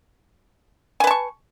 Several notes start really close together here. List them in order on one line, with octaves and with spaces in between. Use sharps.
G#5 B4 A5 C#6